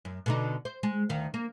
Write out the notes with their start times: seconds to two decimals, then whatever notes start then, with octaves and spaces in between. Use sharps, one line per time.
0.05 F#2
0.26 B2 D3 D#4
0.65 C5
0.83 G#3
1.09 D2 D#3 F5
1.34 A#3